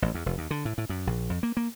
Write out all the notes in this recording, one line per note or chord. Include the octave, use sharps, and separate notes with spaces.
A1
E2
F1
D#2
D3
A2
A2
F#2
A#1
F2
A#3
A#3